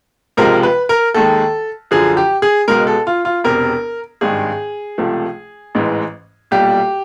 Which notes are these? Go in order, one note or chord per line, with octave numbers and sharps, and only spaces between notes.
C#2 C3 F3 G#3 A#4
B4
A#4
D#2 D#3 G#3 A4
F#2 D3 F3 G#4
G4
G#4
C#2 B2 G#3 A#4
A4
F4
F4
E1 E2 C3 A#4
G#1 G2 D#3 G#3 G#4
C#2 C3 F3 A3
A1 G#2 E3 G#3
B1 A#2 G3 G4